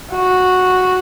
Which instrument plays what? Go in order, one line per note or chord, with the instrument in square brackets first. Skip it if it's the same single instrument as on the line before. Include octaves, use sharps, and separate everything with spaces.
[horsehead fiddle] F#4